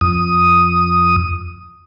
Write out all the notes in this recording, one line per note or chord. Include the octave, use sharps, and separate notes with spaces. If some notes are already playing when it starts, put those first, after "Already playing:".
F2 D#6